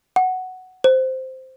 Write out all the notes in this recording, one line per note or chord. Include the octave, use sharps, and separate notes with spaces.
F#5
C5